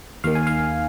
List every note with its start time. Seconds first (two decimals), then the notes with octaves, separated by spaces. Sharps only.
0.24 D#2 D#3 F5
0.35 G#5
0.47 F5